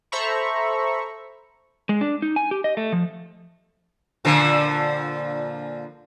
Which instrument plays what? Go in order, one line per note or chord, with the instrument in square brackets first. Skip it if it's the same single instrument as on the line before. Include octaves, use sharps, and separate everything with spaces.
[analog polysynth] A4 C5 E5 A#5 B5 C#6
[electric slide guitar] G#3
D4
D#4
G#5
G4
D#5
A3
F3
[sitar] A#2 D3 F3